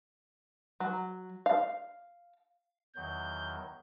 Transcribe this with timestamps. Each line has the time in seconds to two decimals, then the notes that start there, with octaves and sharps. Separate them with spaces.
0.80 F#3
1.46 F5
2.96 E2 D#3 F#3 G6